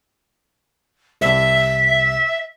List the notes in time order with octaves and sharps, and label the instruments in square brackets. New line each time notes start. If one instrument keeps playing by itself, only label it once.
[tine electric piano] C2 C3 [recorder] E5